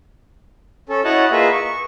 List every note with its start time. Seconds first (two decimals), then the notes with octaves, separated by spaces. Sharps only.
0.89 C#4 A4
1.04 E4 F#4 C#5 D#5 F#5 A5
1.32 A#3 F4 G#4 B4 D#5 E5
1.52 C#6